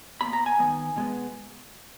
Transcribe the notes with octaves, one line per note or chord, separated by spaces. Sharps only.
B2 A#3 B5
A#5
G#5
D#3 G#3 B3
B2 G#3 B3